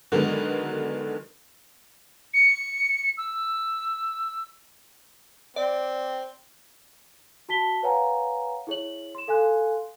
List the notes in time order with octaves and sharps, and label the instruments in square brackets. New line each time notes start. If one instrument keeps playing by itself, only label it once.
[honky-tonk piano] D3 D#3 F#3 G#3 B3
[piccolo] C#7
E6
[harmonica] C4 [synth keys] D5
[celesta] F#4 A5 B6 G7
B4 C#5 F5 F#5 G#5 A#5
E4 G#4 C#5 F#7
C6 E7
A4 F5 G#5 C6 F#6